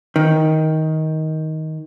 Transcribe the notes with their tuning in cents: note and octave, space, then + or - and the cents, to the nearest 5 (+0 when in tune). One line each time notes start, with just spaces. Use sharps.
D#3 +15